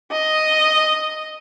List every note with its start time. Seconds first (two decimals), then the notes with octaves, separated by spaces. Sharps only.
0.11 D#5